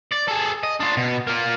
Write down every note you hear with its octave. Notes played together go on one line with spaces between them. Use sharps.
D5
G#4 A4
D#5
D4 F4
B2
A#3 F4